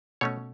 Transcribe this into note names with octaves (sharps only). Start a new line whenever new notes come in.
B2 A3 C#4 C#5